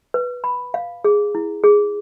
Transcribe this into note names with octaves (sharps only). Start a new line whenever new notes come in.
B4
B5
F5
G#4
E4
G#4